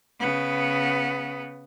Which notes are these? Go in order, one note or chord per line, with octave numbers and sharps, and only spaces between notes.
C#3 B3